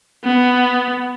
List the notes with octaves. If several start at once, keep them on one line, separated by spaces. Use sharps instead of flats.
B3